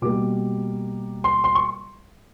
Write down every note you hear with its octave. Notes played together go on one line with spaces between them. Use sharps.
B2 G3 A#3 D6
C6
C6
C#6